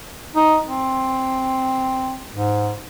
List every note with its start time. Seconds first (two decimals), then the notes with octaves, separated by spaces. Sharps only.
0.35 D#4
0.65 C4
2.35 G#2